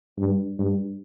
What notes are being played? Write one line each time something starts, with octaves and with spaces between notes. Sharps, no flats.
G2
G2